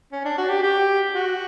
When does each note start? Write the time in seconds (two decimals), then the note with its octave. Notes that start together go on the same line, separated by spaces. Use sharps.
0.12 C#4
0.25 D4
0.38 F#4
0.50 G4
0.63 G4
1.15 F#4